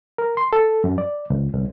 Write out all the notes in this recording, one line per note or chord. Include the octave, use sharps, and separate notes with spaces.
A#4
C6
A4
F#2
D5
C#2
C2